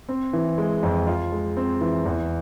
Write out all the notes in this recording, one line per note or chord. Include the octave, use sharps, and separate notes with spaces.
C4
E3
G#3
F2
F4
G#3
C4
E3
E2